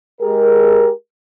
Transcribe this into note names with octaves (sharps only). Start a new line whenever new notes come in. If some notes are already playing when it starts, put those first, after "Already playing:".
G#3 G4 G#4 A#4